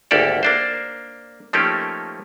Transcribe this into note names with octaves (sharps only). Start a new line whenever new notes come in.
G#1 D2 A#3 G4 A4 D5
A#3 D4 C5
F3 A3 A#3 C#4 D#4 G4